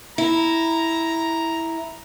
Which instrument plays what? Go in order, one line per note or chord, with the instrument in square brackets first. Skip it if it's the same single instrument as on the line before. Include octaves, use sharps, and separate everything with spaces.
[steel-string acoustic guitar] E4 [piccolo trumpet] A#5